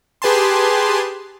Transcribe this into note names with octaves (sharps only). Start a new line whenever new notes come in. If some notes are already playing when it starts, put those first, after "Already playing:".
G4 G#4 B4 G#5 A5 C6